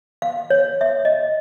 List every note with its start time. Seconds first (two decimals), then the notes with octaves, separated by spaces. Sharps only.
0.22 F5
0.50 C#5
0.81 E5
1.05 D#5